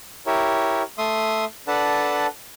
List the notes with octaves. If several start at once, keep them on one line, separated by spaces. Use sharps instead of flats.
E4 G4 A#4 C#5
A3 E5 C6 D#6
D4 A4 B4 F#5 A5